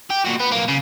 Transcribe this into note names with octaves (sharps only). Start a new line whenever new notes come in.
G4
A#2 F#4
B3
B1 A#3
C#3